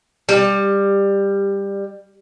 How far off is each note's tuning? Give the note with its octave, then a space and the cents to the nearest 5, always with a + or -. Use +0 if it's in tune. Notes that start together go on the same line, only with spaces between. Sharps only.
G3 +15